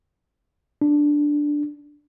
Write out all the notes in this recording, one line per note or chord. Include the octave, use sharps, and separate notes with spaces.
D4